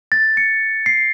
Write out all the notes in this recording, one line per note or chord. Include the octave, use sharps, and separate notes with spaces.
A6
C#7
C7